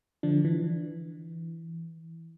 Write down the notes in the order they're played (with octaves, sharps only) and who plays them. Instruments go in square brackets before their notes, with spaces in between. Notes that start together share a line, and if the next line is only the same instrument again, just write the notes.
[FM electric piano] D3 F3 D4
E3